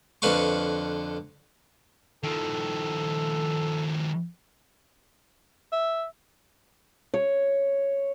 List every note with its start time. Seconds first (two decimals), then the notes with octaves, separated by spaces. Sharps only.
0.22 F2 D3 B4 F5 C#6
2.24 D#3 F3 A4
5.72 E5
7.14 C#5